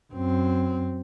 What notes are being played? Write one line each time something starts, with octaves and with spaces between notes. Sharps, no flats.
F#2 C4